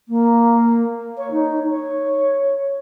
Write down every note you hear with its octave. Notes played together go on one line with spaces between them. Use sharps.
A#3
C#5
D#4
C#5